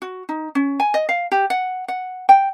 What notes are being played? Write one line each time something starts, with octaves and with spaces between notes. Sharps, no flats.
F#4
D#4
C#4
G#5
D#5
F5
G4
F#5
F#5
G5